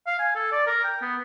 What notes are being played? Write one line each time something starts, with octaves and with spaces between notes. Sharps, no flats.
F5
G#5
A4
D5
A#4
G5
B3